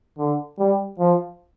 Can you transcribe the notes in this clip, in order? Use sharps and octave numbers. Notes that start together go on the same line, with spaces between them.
D3
G3
F3